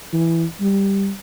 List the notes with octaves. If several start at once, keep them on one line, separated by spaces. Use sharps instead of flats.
E3
G3